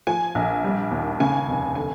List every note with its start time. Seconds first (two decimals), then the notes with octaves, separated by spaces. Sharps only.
0.07 F3 G#5
0.35 A#1
0.64 G3
0.91 D#2
1.20 C#3 G#5
1.48 F1
1.75 D3 G#5